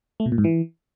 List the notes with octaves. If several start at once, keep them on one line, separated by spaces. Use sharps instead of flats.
A3
B2
A#2
G#2
E3